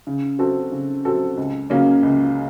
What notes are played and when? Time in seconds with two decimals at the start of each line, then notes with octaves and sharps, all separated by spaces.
0.07 C#3
0.39 F#3 C4 F#4 A4
0.72 C#3
1.05 F#3 C4 F#4 A4
1.37 C#2
1.70 C#3 F#3 A#3 C#4
2.03 C#2